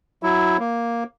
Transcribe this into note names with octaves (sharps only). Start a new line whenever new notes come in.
F#3 E4
A#3